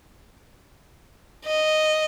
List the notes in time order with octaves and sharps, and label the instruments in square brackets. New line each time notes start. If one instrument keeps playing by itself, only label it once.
[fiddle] D#5